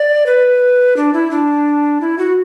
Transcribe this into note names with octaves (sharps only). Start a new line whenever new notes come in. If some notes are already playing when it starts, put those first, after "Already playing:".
Already playing: D5
B4
D4
E4
D4
E4
F#4